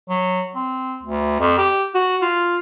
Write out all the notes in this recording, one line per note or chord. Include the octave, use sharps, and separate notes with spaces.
F#3
C4
D2
F2
G4
F#4
F4